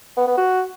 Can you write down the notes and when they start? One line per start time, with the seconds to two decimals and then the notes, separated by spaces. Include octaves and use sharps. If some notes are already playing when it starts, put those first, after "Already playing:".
0.17 B3
0.27 B3
0.38 F#4